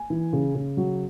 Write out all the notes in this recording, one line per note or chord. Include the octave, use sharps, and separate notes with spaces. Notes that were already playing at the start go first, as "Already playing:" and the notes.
Already playing: G#5
E3
C#3
C#3
F#3